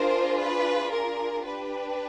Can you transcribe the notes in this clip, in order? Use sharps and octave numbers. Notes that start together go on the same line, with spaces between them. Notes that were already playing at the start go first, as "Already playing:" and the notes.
Already playing: D4 F4 G#4 A#4 C5
B4
A#4
D4 G4 B4